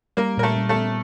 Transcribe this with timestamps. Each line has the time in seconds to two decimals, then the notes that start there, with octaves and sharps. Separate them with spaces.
0.17 G3 A#3 A#4
0.37 A#2 A#4
0.43 A3 A4
0.56 G3
0.69 A3 A4
0.76 B3